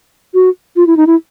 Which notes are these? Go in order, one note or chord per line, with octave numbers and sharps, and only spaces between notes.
F#4
F4
E4
D#4
E4